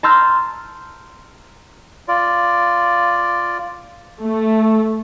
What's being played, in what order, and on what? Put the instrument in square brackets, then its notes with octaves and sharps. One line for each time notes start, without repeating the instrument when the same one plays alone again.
[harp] A5 A#5 C6 E6 F6 G6
[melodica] F4 D5
[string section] A3